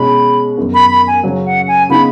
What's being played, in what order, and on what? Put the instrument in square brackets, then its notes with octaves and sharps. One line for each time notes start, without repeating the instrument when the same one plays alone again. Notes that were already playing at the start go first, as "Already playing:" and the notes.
Already playing: [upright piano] B2 G#3 C#4 [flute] B5
[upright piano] F#2 D#3 B3
[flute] B5
B5
G#5
[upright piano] C#3 F#3 C#4
[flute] F#5
G#5
[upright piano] C#3 B3 D#4 [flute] B5